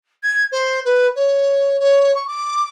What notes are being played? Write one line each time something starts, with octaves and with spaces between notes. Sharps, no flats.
G#6
C5
B4
C#5
C#5
C#6
D6